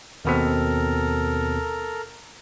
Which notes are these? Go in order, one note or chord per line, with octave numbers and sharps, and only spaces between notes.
D#2 B2 C4 A4 A#4 A#5